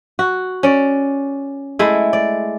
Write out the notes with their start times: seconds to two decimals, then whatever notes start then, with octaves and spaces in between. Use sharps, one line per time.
0.19 F#4
0.63 C#4 D5
1.79 G#3 A3 E4
2.13 D5